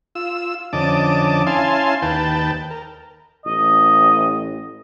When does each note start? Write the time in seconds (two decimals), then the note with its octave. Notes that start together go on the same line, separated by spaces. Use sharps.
0.15 F4 E6
0.73 F2 D3 C#4 D#5 A5 D6
1.47 C#4 E4 F5 G#5 A5 C6
2.02 D#2 B4 G5 A5
2.71 A#4
3.46 A1 D#5